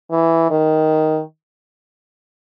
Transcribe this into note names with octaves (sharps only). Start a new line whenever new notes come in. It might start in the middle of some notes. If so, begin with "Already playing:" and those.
E3
D#3